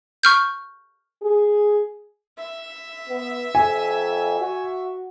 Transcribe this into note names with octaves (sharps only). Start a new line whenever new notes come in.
C#6 F6 G6
G#4
E5
B3
F2 G#5
F#4